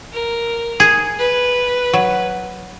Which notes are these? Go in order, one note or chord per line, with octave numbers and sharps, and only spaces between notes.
A#4
G#4
B4
F#3